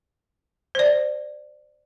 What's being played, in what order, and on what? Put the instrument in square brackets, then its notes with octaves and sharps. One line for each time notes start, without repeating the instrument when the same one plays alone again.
[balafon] C5 D5